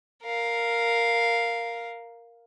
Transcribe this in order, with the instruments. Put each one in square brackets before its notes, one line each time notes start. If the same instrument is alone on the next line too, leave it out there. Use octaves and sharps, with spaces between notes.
[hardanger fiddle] A#4 F5